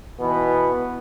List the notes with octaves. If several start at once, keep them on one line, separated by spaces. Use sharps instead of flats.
B2 E3 B3